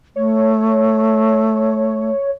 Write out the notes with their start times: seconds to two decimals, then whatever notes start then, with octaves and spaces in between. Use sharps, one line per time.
0.16 A3 C#5